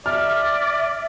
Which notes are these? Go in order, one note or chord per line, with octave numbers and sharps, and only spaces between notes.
D5 E5 F6